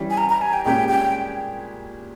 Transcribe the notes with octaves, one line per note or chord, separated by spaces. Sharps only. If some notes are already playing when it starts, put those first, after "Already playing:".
Already playing: E3 G3 C#4 G4
G#5
A#5
A#5
G#5
G5
A#2 G#3 C#4 G4 G5
G5